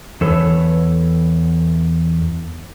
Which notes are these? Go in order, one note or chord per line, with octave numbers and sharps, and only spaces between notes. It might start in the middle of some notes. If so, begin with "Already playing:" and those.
E2 A4 B4 C#5